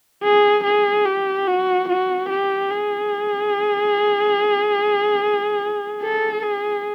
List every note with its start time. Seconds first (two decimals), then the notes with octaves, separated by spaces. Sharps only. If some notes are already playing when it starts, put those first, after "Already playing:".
0.23 G#4
0.64 G#4
1.05 G4
1.47 F#4
1.89 F#4
2.29 G4
2.70 G#4
6.02 A4
6.43 G#4